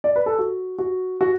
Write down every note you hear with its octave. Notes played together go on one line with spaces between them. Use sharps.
D5
B4
A4
F#4
F#4
F#4